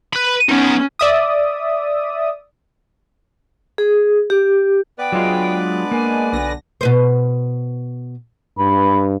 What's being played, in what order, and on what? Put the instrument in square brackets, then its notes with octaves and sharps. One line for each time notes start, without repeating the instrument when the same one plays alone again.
[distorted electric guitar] B4 B5
[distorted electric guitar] B3 D#4 [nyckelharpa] C#4
[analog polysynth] D5 E5 D#6
[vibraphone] G#4
G4
[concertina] B3 B4 D5 [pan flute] G5
[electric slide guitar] F#3 F4 [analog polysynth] G#3 D4
[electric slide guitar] A#3 [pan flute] G#5
[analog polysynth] B1 D3 A#6
[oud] B2 B4 C5
[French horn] G2 [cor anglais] B4